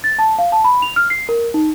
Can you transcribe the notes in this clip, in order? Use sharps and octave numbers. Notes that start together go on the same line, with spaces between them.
A6
A5
F5
A5
B5
F7
F6
C7
A#4
D#4